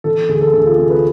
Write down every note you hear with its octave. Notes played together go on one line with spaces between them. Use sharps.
E3 A4
D2 G#4
A4
D2 G#4
F4
C3 G#4
B4